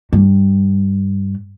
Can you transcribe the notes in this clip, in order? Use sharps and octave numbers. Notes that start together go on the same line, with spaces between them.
G2